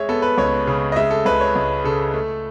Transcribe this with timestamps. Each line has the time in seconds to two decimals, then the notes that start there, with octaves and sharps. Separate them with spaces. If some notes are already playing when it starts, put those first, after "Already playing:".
Already playing: G#3 C#5 E5
0.09 B3 A4
0.22 B4
0.37 C#2 C#5
0.67 C#3
0.92 D#5
0.96 G#3 E5
1.11 A4
1.25 C#2 B4
1.41 C#5
1.55 C#2
1.84 C#3 A4
2.14 A3